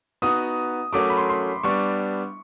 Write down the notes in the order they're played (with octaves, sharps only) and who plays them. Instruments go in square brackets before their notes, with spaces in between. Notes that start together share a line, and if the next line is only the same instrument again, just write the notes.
[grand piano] B3 D#4 F#4 [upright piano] D#6
[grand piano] F#3 A3 C#4 F#4 A#4 [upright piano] D6
[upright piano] B5
C6
C6
[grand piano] G3 B3 D4 [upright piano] C#6